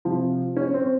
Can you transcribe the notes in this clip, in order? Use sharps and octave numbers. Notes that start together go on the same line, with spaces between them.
C3 F3
C#4
C4